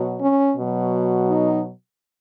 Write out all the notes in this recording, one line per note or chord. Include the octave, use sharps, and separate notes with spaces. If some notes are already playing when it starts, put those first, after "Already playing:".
Already playing: B2 F#3
C#4
B2 F#3
D#4